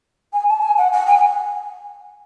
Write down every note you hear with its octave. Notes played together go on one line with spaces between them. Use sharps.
G#5
A5
G#5
F#5
F#5
G#5